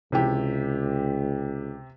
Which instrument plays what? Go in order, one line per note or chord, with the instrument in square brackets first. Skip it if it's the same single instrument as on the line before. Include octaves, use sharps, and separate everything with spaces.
[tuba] C#2 [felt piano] C3 E3 G4